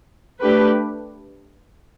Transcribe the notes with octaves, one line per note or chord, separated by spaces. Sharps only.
A3 D4 G4 B4